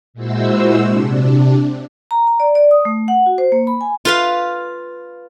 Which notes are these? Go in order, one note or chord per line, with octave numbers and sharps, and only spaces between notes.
A#2 G#3 E4 F#4 C5 E6
C3 D4
A#5
A#5
D5
D5
D#6
A3
F#5
F#4
C5
A#3
B5
G#5
F4 B4 F5